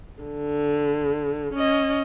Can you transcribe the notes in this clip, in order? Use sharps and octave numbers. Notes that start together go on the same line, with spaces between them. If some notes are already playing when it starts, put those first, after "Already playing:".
D3
C#4 D#5